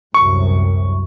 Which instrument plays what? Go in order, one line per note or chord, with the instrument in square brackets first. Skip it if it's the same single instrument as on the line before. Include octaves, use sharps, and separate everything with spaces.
[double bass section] C2 F#2 A2 [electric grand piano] C#6